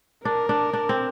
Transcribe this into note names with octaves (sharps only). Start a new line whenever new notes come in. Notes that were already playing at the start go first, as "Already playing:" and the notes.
D4 A#4
D4
D4
C4